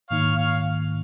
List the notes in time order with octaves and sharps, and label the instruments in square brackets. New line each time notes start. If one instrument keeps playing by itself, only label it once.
[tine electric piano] G#2 D#3 A#3 D#4 [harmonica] C#5 F5
[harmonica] C#5 F5